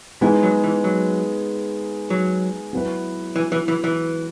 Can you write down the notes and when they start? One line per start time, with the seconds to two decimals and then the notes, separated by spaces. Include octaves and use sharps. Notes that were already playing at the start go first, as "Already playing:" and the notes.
0.21 E3 G#3 B3 D#4 G#4
0.43 F#3
0.64 E3
0.84 F#3
2.10 F#3
2.73 F#3 B3 E4 B4
3.36 E3
3.52 E3
3.68 E3
3.84 E3